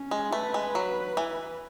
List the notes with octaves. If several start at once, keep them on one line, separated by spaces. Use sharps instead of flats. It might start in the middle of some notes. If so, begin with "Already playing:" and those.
Already playing: C#4
G#3
A3 B4
G#3
F#3
E3